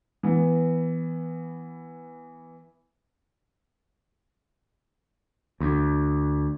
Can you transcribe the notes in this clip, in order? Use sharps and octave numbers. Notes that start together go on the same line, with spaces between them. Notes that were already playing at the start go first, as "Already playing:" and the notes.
E3 B3
D2